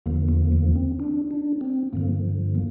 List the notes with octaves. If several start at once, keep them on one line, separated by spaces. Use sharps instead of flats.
E2 D3 F3 A#3
A#3
A#3
C4
D4
D4
C4
G2 D3 F3 A#3
A#3